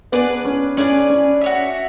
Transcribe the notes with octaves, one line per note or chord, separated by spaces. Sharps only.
B3 D4 G#4 B4 D5
C#4
C#4 D4 G#4 B4 D5
C#4
F#4 C#5 E5